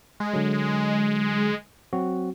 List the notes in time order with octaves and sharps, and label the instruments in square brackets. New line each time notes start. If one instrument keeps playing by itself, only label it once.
[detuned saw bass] G#3
[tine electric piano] D3 F#3
F#3 C4 F#4